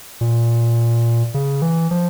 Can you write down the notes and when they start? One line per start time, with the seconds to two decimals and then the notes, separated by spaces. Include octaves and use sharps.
0.21 A#2
1.34 C#3
1.62 E3
1.91 F3